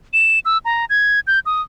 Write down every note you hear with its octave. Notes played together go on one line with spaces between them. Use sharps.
E7
E6
A#5
G#6
G6
D#6